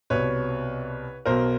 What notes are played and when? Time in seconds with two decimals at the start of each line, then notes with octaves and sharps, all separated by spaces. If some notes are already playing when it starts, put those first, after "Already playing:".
0.10 C2 B2 B4 C#5
1.25 B1 B2 A#4 C5